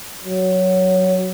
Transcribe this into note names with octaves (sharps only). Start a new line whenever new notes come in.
F#3